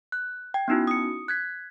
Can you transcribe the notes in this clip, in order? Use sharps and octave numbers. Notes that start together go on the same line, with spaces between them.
F#6
G5 G#6
B3 C#4 D#4 E4 F#4
D#6 C#7
F#6 G#6 B6